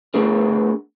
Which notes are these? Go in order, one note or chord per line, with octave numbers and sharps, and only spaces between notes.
A3 B3 D4 G#4 A#4